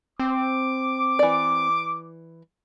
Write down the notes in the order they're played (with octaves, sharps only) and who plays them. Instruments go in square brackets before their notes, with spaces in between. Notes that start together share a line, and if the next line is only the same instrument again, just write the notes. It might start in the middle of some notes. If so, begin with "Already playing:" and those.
[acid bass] C4 [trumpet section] D6
[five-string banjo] E3 D5